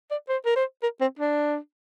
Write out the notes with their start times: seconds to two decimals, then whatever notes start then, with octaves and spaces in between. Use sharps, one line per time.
0.11 D5
0.29 C5
0.45 A#4
0.56 C5
0.82 A#4
1.01 C4
1.19 D4